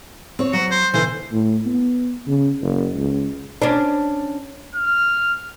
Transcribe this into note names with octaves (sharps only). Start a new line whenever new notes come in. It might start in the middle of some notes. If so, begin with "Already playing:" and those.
C4 C#5
F#3 F#4
C5
B2 D3 E3 C5
A2
B3
C#3
F#1
C#2
C#4 D4
F6